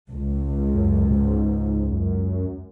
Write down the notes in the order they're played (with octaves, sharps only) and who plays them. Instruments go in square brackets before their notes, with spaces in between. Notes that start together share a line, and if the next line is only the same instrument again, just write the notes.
[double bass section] C#2
[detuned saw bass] F#2
G#2
F#2